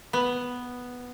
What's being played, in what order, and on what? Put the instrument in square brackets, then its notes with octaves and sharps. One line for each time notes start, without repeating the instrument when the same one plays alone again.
[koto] B3